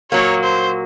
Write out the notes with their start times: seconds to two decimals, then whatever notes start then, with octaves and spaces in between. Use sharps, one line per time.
0.12 A#2 F#3 A#3 C#5
0.44 C5